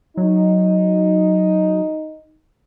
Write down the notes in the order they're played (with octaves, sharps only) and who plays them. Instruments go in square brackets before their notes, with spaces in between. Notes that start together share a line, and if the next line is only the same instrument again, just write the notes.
[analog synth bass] F#3 [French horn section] D#4